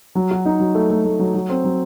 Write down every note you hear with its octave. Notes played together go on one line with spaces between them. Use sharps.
F#3
F#4
D#4
F#3
A3
A3
A3
F#3
F#3
C4
F#3